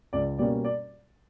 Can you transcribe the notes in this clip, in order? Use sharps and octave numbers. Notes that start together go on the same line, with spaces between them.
C#2 D5
B2 G3 A#3 C#4 D5
D5